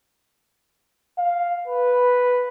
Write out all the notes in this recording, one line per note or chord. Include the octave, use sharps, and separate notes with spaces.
F5
B4